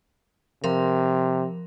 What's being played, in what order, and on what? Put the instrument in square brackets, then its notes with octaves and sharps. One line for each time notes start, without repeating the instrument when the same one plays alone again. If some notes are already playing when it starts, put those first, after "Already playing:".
[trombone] C3 [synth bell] F3 A#4